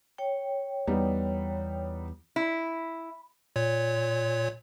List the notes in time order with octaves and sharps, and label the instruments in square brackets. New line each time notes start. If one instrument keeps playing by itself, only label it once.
[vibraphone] C#5 G5
[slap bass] E2 [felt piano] G3 B3 D#4
[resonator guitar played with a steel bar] E4
[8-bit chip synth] A#2 C#5